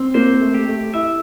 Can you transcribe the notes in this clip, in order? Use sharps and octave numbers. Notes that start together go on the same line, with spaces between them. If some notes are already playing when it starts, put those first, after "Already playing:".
Already playing: C4
A#3 C5
A3
G4
A3
E4 E5